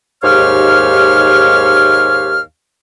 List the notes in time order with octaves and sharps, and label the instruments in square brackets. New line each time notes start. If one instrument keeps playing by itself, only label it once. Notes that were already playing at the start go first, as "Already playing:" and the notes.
[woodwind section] D#2 G#2 G4 C#5 F5 F6